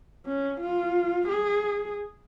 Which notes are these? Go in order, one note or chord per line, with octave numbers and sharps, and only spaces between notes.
C#4
F4
G#4